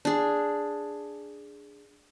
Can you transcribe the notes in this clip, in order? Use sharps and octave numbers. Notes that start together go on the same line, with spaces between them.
D4 G#4